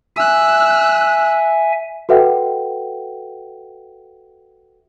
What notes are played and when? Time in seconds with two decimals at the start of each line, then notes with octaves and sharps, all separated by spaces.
0.16 E5 G#5 E6 F#6
2.09 F#4 A4 B4 E5 F#5 G5